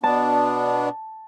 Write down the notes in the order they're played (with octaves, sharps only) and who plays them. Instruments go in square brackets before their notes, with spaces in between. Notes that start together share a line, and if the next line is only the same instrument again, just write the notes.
[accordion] B2 B3 D4 [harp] A5